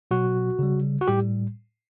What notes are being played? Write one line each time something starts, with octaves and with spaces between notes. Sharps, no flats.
B2 F#3 F#4
C#3 G3
F#4
A2 G3 G4